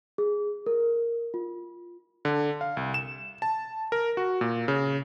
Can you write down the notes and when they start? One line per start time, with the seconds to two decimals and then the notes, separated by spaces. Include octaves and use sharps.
0.18 G#4
0.66 A#4
1.34 F4
2.25 D3
2.61 F5
2.77 C2
2.94 E7
3.42 A5
3.92 A#4
4.17 F#4
4.41 A#2
4.68 C#3